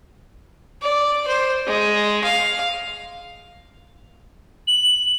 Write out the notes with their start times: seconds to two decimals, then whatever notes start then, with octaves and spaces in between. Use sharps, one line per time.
0.82 D5
1.27 C5
1.66 G#3
2.24 F5
4.67 F#7